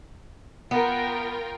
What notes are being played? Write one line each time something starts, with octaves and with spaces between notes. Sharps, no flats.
B3 F4 A#4 G5